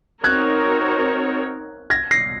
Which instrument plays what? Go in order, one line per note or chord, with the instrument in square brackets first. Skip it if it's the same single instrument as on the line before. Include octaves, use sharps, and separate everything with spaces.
[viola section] C4 D#4 F#4 A#4 C#5 [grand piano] F#6 G#6
[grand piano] G#6 A#6
A#6 C7